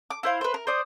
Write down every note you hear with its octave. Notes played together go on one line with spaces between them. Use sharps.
D6
E4 C5 F5
B4 C5
A#4
C5 D5 D#6